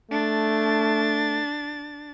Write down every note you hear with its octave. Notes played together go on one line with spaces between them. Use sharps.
A3 D4 A6